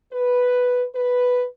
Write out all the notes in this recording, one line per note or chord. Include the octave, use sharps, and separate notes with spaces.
B4
B4